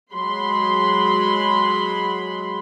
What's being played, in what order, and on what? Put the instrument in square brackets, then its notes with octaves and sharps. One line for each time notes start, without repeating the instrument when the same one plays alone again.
[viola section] F#3 G#3 B5 C6